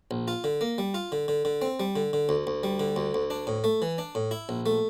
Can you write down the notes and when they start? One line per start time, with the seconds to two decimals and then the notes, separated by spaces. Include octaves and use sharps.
0.11 A#1
0.28 F4
0.44 D3
0.61 A#3
0.78 G3
0.94 F4
1.12 D3
1.28 D3
1.45 D3
1.62 C4
1.80 G3
1.96 D3
2.13 D3
2.29 D2
2.47 D2
2.63 G3
2.80 D3
2.96 D2
3.14 D2
3.30 D4
3.47 A2
3.64 A3
3.82 E3
3.98 D4
4.15 A2
4.31 E4
4.49 A#1
4.66 A3